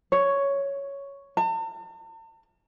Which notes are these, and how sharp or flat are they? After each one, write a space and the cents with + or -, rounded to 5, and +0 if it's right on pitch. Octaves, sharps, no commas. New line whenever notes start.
C#5 +5
A5 +45